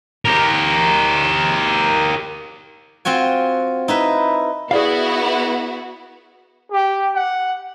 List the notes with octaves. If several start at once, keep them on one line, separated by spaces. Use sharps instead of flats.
G4 A#4
C4 F4 F#4 G#5
D#4 E4 B4
B3 E4 F#4 G#4 D5 F5
G4
F#5